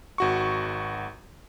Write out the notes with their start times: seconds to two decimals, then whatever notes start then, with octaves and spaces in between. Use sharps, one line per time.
0.18 G#1 F#4 C#6